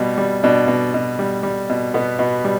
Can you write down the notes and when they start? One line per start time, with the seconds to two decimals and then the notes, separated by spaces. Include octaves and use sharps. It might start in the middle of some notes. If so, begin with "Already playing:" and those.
Already playing: B2 G3
0.18 G3
0.44 B2 D4
0.68 B2
0.94 B2
1.19 G3
1.43 G3
1.69 B2
1.94 B2 B3
2.19 B2
2.44 G3